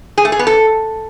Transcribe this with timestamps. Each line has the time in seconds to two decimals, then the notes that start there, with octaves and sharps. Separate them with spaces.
0.18 G#4
0.25 A3
0.32 G#4
0.39 B3
0.47 A4